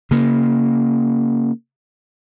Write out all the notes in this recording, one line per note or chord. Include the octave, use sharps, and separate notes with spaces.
C#3 A#3